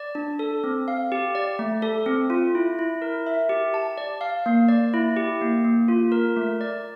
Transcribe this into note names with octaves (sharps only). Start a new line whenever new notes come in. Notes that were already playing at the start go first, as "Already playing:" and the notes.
Already playing: D5
D4
A4
C4
F5
G4
D5
A3
A4
C4
F4
E4
E4
A#4
E5
G4
A5
D5
F5
A#3
D5
E4
G4
A#3
A#3
F4
A#4
A3
D5